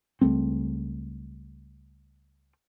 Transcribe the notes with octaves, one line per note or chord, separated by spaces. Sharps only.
C#2 G3 A3 C4